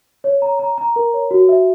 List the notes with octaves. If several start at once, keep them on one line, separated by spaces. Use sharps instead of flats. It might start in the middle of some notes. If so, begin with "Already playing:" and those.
C#5
A#5
A#5
A#5
A#4
C#5
F#4
E5